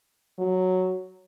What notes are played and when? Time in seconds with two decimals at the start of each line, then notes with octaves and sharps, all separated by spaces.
0.39 F#3